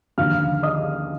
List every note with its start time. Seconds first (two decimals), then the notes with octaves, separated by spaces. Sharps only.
0.18 D#2 D3 F3 F5 F6
0.63 D#5 D#6